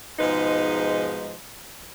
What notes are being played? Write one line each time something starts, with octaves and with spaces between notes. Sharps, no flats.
G#2 B2 F3 G#3 D#4 B4